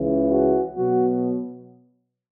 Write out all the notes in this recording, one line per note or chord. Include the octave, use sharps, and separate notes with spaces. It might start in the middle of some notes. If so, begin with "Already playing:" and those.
Already playing: C#2 C#3 E3
F#4
B2 F#3 B3 F#4